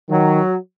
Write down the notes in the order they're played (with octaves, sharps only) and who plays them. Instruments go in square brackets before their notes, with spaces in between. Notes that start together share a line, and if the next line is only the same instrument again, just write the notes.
[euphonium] D#3 [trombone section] F#3